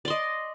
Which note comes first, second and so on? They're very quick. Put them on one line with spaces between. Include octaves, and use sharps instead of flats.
D5 C6 D#5